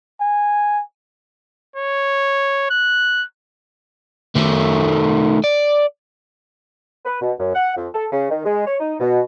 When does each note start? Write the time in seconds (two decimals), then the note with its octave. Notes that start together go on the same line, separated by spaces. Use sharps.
0.20 G#5
1.76 C#5
2.70 F#6
4.36 D#3 A3
5.44 D5
7.05 B4
7.21 B2
7.38 F#2
7.54 F#5
7.76 F2
7.94 A4
8.11 C#3
8.30 D#3
8.45 G#3
8.66 C#5
8.80 D#4
9.00 B2